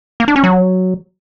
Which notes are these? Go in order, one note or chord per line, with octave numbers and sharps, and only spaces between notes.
A#3
D4
C#4
F#3